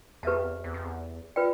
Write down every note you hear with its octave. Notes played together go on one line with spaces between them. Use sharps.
E2 G4 B4 E5 A5
F2
E2
F2
E2
F2
E2
F4 B4 D5 G5